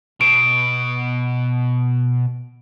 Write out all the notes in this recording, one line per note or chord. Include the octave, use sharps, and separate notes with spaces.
B2 D7